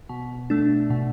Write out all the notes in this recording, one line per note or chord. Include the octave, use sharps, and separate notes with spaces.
B2
A3 D4
B2